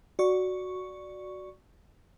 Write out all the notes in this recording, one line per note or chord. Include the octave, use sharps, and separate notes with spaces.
F#4 D5 C#6